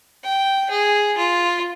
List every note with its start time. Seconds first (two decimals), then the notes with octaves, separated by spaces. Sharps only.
0.24 G5
0.70 G#4
1.18 F4